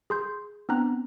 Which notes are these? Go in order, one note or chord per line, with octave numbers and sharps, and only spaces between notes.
G#4 C6 G6
B3 C4 D4 A#5 F#6